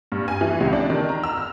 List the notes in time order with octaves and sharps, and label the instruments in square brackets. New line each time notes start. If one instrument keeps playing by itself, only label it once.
[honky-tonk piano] G2
G#5
E3
C#2
D4
D#3
A#5
E6
F6